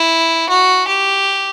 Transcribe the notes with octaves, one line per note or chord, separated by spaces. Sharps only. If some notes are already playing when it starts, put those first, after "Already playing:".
Already playing: E4
F#4
G4